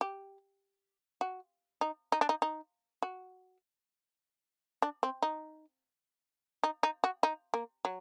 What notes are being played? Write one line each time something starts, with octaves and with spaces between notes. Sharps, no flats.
G4
F#4
D#4
D#4
D4
D#4
D#4
F#4
D4
C4
D#4
D#4
D#4
F#4
D#4
A#3
F#3